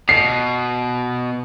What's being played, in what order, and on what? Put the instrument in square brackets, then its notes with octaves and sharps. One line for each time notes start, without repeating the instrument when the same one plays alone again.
[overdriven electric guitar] B2 [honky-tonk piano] C7